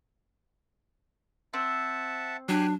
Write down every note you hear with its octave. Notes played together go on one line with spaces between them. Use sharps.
C4 E5 F#5 A5
F#3 D4 G4 G#5 F#6